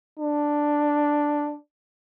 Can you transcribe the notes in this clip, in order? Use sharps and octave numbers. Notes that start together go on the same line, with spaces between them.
D4